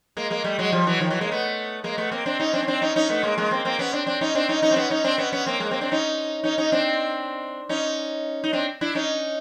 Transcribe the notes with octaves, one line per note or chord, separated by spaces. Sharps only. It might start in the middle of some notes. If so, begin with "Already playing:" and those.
G#3 A#3
G#3 A#3
G3 A3
F#3 G#3
F3 G3
E3 F#3
D#3 F3
E3 F#3
G#3 A#3
A3 B3
G#3 A#3
A3 B3
A#3 C4
C4 D4
C#4 D#4
C4 D4
C#4
C4 D4
C#4 D#4
C#4 D#4
A3 B3
G#3 A#3
G#3 A#3
A#3 C4
A#3 C4
B3 C#4
C4 D4
C4 D4
C#4 D#4
C4 D4
C#4 D#4
C#4 D#4
C4
B3 C#4
C#4 D#4
C4 D4
B3 C#4
B3 C#4
A#3 C4
G#3 A#3
A#3 C4
C4 D4
C#4 D#4
C#4 D#4
C#4 D#4
C4 D4
C#4 D#4
D#4
C4 D4
D4 E4
C#4 D#4